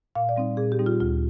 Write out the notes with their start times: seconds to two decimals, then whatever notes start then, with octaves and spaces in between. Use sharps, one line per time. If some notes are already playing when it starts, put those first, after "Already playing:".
0.15 A#2 F5
0.29 D5
0.36 G3 C4 D#4
0.57 A#2 G#4
0.72 G4
0.79 G3 C4 D#4
0.86 F4
1.00 D2 F4